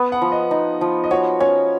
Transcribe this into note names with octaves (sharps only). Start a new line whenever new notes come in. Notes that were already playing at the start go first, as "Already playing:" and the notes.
Already playing: B3
F#5
F3
D#5
D#4
F3
D#5
F#4 C#5
C#4 C#5